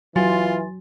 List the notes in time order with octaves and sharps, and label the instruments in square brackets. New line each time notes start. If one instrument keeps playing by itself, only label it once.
[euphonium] E3 [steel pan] F#3 [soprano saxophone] F4 [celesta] G#5 C6 A6